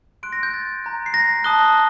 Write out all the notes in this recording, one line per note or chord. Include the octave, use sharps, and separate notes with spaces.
C6 F#6 D7
A#6
G6
A6
A#5 F#6
C7
A#6
A5 D#6 F#6 G7